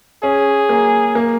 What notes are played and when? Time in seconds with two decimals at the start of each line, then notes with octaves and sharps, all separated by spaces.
0.23 C#4 G#4
0.69 A#3
1.15 A#3